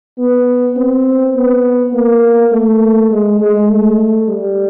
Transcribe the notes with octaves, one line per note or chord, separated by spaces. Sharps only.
B3
C4
B3
A#3
A3
G#3
G#3
A3
G3